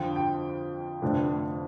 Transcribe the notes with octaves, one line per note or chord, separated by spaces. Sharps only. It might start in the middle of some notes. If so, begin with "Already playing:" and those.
Already playing: F2 D3 F3 G5
G5
F1 F2 D3 A3 D4